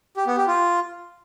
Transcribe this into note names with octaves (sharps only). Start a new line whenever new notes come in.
G4
B3
G4
F4